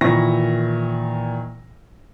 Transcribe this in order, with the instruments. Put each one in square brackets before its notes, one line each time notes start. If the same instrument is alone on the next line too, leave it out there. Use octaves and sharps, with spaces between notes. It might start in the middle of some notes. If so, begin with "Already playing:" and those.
[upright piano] A#2 D#3 E3 E4 C#6 A#6